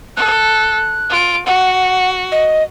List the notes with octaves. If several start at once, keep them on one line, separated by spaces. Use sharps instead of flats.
A4 F#6
F4 D7
F#4 F#5
D#5